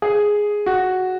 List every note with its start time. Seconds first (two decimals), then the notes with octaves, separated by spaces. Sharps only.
0.02 G#4
0.66 F#4